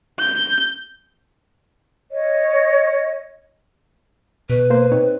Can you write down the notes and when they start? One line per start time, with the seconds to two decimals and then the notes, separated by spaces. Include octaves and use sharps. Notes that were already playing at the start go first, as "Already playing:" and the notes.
0.20 G6
2.11 C#5 D#5
4.50 B2 B4
4.70 A#3 C5
4.92 C4 D#4 C#5